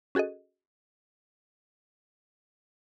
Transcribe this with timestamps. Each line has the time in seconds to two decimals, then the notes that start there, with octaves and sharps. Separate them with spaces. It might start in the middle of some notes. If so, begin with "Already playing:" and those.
0.15 C#4 F#4 G#4 A4 D#5